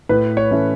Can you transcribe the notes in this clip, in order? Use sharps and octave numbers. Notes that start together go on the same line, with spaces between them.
A2 B4
C#5
E3 A3 C#4 E4